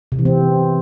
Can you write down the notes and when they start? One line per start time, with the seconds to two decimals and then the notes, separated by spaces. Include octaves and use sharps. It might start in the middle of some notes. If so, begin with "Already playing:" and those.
0.12 C3
0.19 E3
0.25 C4